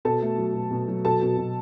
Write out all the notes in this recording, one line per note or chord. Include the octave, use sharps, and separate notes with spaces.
B2 A4 A5
A3
F#3
B2
B2
F#3
B2 A4 A5
B2
B2